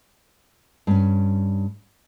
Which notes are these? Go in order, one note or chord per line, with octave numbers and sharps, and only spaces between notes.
G2 C#4